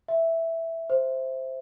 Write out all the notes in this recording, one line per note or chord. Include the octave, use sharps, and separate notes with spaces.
E5
C5